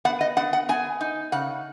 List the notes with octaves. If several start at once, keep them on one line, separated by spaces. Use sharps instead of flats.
B3 F#5
D#5
B3 F#5
F#5
B3 G#5
D#4
C#3 F#5